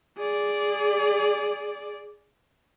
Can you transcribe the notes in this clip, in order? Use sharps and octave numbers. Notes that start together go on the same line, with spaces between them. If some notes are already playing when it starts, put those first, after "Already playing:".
G#4 D5